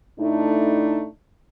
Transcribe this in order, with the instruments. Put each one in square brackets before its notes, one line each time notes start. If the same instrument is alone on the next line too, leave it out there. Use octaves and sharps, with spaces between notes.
[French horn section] A2 A3 D4 D#4